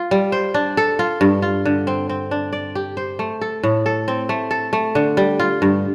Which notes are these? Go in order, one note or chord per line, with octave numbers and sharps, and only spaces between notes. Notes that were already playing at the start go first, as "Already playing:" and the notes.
Already playing: F4
G3
C5
D4
A4
F4
G2
F4
D3
C4
C4
D4
D5
G4
C5
A3
A4
A2
A4
C4
A3
A4
A3
D3
G3
F4
G2